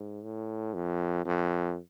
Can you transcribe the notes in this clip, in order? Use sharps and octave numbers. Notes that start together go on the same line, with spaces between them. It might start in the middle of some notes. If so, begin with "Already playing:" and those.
Already playing: G#2
A2
F2
F2